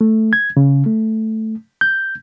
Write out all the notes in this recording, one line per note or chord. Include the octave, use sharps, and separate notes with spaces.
A3
G#6
C#3
A3
G6